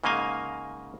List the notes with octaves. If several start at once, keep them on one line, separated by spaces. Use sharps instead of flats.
G#2 C#3 A#3 D#5 F5 G#5